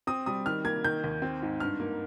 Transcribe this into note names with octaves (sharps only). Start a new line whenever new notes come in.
C4 D#6
G3 D#6
D#3 F6
A#3 G#6
D#3 G6
D#2
C4
G#2
G2 F6
A#3